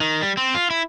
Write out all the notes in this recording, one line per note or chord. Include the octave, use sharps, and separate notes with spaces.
D#3
G3
C4
F4
E4